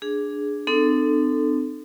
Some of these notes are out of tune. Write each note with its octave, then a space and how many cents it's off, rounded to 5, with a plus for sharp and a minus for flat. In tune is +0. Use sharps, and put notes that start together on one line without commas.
D4 +0 G#4 +0
C4 -25 D#4 -45 A4 +0